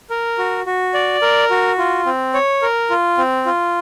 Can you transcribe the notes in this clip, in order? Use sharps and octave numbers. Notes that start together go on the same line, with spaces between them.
A#4
F#4
F#4
D5
A#4
F#4
F4
C4
C#5
A#4
F4
C4
F4